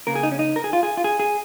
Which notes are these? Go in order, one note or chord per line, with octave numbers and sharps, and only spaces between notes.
C#3 A#3 A#4
G#4
D#4
C#4
D#4
A#4
G#4
F4
G#4
F4
G#4
G#4